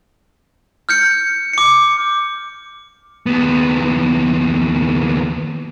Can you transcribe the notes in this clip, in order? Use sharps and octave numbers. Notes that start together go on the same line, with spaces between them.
F6 G6 C#7
D6 C#7
D#2 B3